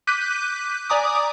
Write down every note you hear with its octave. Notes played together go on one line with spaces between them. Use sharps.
D6 F#6 G6 B6 D#7
D5 G#5 A#5 D6 D#6